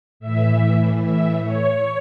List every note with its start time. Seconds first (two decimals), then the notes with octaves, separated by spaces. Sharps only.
0.20 A2 E3 E5
1.02 E5
1.44 C#5